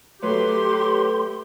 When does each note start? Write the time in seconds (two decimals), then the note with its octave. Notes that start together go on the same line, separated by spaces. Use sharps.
0.23 F#3 A3 G4 B4 C#5 C6